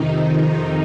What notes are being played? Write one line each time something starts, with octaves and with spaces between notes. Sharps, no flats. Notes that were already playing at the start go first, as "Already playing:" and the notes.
Already playing: F2 C3 D#3 D#4
D#4